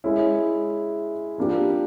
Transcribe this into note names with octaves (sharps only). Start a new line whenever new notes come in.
G#3 C#4 E4
F3 A#3 D4 G4